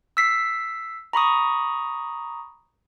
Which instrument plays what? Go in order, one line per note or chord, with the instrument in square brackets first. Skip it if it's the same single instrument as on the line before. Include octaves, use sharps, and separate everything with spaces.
[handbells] E6 B6 C7
A#5 B5 C#6 D#6